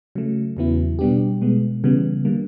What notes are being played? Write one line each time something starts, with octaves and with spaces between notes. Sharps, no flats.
C#3 F#3 A3
E2 C#3 F#3 B3 E4
B2 G3 B3 D4 G4
B2 G#3 B3
C#3 E3 G3 B3
D3 G3 A#3